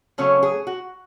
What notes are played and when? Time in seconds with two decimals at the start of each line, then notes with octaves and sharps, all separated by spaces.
0.18 C#3 F#3 A3 C#4
0.43 G#4
0.67 F#4